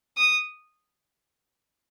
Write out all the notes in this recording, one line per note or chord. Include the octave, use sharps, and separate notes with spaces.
D#6